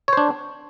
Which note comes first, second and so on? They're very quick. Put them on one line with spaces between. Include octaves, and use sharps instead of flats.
C#5 C5 D4